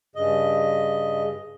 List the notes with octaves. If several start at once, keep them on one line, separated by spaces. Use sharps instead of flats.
G2 C#3 D#5